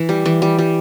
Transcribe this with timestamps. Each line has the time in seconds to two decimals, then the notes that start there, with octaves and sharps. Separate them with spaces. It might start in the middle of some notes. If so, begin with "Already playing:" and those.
Already playing: E3
0.09 G3
0.26 E3
0.42 G3
0.59 G3